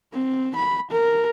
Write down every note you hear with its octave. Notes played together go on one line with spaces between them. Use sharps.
C4
B5
A#4